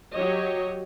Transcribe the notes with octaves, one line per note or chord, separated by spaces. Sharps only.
F#3 G4 C#5 D#5